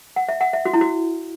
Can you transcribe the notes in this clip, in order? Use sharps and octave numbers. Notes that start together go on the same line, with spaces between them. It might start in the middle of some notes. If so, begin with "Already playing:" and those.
F#5
E5
F#5
E5
F#4
E4
F#4